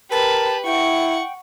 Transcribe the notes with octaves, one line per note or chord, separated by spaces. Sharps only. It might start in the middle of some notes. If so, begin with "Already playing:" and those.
G4 A#4 B4 A5
E4 F#5 G5 C#6